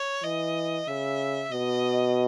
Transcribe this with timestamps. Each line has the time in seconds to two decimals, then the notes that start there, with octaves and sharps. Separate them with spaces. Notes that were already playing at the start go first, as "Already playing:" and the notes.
Already playing: C#5
0.23 E3 D#5
0.87 C#3 E5
1.52 B2 D#5